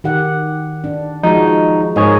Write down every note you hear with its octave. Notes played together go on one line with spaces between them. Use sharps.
D#3 G4 F#5
D4
F3 G#3 D#4 F#4
G#2 G#4 A#4 C#5 D#5